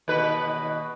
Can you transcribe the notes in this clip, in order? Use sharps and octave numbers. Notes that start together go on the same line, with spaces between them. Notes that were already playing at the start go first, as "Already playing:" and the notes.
D#2 B2 B4